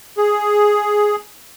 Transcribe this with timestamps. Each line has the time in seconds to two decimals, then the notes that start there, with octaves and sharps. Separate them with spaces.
0.18 G#4